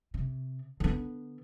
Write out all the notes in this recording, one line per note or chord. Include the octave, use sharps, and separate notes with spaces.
C3
D3 B3